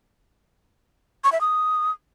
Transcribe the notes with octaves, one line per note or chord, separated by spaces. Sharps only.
C#6
E5
D#6